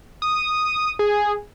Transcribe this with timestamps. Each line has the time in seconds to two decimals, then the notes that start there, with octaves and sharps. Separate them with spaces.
0.22 D#6
0.99 G#4